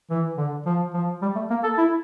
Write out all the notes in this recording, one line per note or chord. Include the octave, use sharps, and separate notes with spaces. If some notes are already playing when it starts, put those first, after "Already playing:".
E3
D3
F3
F3
G3
A3
A#3
A4
E4